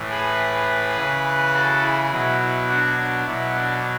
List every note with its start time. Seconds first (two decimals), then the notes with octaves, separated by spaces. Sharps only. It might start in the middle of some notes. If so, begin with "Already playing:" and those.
Already playing: A2 E3
0.10 G#4 B4
0.96 C#3 E3
1.54 F#4 A4
1.82 E4 G#4
2.10 B2 F#3 E4
2.40 E4
2.68 D4 F#4
2.97 D4
3.26 B2 F#3 E4
3.54 D4